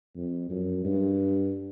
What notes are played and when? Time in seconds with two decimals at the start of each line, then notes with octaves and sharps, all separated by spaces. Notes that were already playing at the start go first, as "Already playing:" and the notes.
0.16 F2
0.50 F#2
0.85 G2